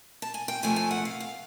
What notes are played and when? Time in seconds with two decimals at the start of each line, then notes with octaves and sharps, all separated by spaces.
0.22 A5
0.34 G#5
0.48 G5
0.63 F2 C3 F3 A3 G#5
0.76 G#5
0.91 F#5
1.05 F5
1.20 F5